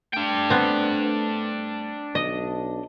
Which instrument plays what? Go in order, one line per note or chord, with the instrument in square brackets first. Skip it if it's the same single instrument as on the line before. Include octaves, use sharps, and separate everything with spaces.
[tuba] A3 [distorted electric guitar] D4 G5
[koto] B3 C4
[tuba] B1 [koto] D#5